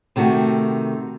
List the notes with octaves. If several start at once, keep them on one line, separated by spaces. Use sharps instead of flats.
C3 D#3 A3 F#4